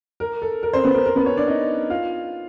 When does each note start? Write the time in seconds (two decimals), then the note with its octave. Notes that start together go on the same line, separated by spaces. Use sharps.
0.20 A#4
0.42 A4
0.63 A#4
0.73 C4 C5
0.84 B3 B4
0.95 A#4
1.06 A#4
1.16 B3 B4
1.26 C#4 C#5
1.37 D4 D5
1.47 D#4 D#5
1.90 F4 F5